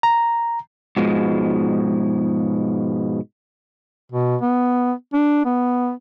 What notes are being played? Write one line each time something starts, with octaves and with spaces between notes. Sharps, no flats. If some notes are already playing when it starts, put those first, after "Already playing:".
A#5
G#2 B2 F3 G#3
B2
B3
D4
B3